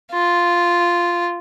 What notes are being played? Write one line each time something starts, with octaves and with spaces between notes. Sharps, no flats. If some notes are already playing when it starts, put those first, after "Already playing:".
F4